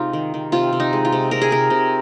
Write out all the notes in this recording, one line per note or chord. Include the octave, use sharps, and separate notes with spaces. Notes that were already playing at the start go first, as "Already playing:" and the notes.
Already playing: C3 G#3 D#4 F4
D#3
D#3
C3 F4
C3
D#4
G#3
F4
C3
C3 A#4
G#4
C3 A#4
C3